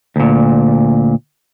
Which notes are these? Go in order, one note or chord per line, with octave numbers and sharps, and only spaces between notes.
D2 A#2